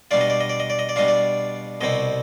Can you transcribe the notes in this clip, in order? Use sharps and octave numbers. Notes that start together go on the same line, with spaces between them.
B2 G3 D4 F4 D5
D#5
D5
D#5
D5
D#5
D5
D#5
D5
B2 G3 D4 F4 D#5
D5
C2 B2 G3 C4 D#5